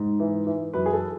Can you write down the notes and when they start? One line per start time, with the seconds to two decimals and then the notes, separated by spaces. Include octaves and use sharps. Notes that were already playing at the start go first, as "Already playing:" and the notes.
Already playing: G#2
0.20 E3
0.47 E3
0.74 F#2 B4
0.86 G#4
0.93 A4